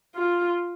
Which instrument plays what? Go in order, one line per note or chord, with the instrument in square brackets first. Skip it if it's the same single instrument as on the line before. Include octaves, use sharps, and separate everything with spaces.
[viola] F4